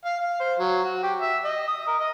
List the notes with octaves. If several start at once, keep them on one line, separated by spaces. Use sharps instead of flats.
F5
F5
C5
F#3
F#4
G4
E5
D#5
D#6
A#4
D#5